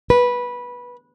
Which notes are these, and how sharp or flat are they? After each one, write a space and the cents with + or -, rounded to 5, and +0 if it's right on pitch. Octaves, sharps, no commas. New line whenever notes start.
B4 -15